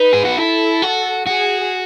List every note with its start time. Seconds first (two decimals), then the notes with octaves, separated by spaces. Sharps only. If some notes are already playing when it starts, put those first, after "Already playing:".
Already playing: D#4 B4
0.13 G#4
0.25 F#4
0.37 E4 A4
0.82 F#4
1.26 F#4 G#4